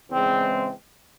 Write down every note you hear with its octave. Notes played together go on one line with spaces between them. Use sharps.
E2 C#3 E3 G#3 C4